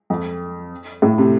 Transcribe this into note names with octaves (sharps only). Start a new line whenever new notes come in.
F2
A2
C3